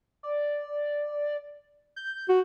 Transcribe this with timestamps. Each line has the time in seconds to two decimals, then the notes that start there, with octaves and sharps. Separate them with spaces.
0.23 D5
1.96 G6
2.29 F#4